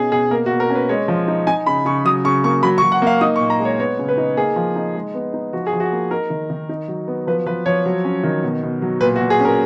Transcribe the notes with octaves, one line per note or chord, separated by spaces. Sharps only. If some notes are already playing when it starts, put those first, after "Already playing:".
Already playing: B2 C#4 D#4 G#4
B2 G#4
A#3 A#4
F#4
B2
A#4
C#4
B4
G#3 C#5
F3
D#4
D#4 G#5
C#3 B5
C#3 C#6
F#3 D#6
C#3 C#6
A#3 C#6
F#3 B5
C#6
F#3
F#5
A#3 F5
D#4 D#6
C#6
A#2
A#5
G#3
C#5
B3 C#5
C#3
B4
D#4
A#3 G#4
F3
D#4
G#3
B3
D#4
F3 F#4
G#4
F3
F#4
A#3
D#4 A#4
D#3
D#3
D#4
F#3
B3
F3 B4
F3 B4
F3 C#5
F#3
C#4
D#3
B2
B2
F#3
A#2 B4
F#4
A#2
G#4
C#4
A#4